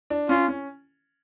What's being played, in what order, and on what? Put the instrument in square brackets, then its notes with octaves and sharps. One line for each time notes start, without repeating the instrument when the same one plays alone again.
[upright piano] D4
[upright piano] C#4 [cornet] F4
[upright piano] C#4